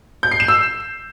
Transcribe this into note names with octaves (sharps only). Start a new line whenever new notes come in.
G6
C7
E7
E6